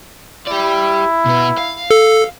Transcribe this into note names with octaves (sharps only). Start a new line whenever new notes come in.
E4 G4 D5
B2 B3
F5
A4